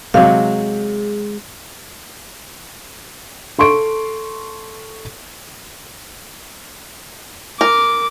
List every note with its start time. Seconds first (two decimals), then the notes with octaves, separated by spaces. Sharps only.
0.14 C3 F#3 G#3 F5
3.59 A4 C6 C#6 D7
7.61 A#4 D6